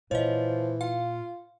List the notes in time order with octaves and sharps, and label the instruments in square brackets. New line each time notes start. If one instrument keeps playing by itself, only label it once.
[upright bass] A#2 [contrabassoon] E3 [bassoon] F3 [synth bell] C#5 D#5
[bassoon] F4 [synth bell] F5